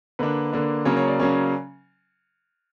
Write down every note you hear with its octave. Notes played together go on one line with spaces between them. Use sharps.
D3 A#3 D4 B4
D3 A#3 D4
C#3 F#3 A#3 C#4 C#5
C#5
D5
C#3 F#3 A#3 C#4